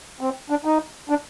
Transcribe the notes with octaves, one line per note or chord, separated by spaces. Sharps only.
C4
D4
D#4
D4